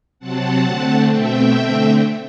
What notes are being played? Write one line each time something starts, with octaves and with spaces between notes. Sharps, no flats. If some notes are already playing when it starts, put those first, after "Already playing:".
C3 F#3 C4 F#5 A5
D3 A3 C4
B2 A3 C4 E5 G5
D3 A3 C4